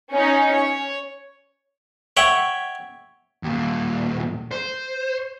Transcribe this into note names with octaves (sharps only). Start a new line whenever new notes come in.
C#4 D#4
C#5
C#5 E5 F#5 G5
D#2 A#2
C5